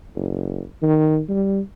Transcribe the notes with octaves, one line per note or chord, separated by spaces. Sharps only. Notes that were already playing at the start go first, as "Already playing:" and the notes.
F#1
D#3
G3